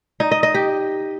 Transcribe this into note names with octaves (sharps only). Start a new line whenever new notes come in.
D#4
D#5
D#5
G4